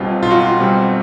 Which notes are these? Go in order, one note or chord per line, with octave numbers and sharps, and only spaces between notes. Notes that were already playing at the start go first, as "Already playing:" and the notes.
Already playing: B1 B2 G3 C4 F4
B1 F4
F#4
F4
B2 G3 C4